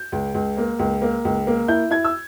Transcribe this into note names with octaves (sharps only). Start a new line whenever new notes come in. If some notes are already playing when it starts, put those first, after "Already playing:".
Already playing: G6
C#2
C#2
A#3
C#2
A#3
C#2
A#3
E4 G6
E4 G#6
E6